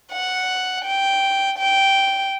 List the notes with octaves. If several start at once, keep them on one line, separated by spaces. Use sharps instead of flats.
F#5
G5
G5